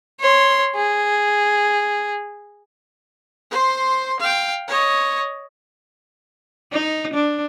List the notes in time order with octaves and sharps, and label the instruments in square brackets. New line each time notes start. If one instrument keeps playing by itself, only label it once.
[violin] C#5 C6
G#4
[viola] C5 C6
F5 G5
C#5 D#5
[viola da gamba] D#4
D4